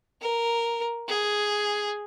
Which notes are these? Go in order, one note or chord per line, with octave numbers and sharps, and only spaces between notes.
A#4
G#4